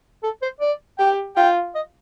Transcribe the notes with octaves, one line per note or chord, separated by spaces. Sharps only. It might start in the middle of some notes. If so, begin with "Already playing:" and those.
A4
C5
D5
G4 G5
F4 G5
D#5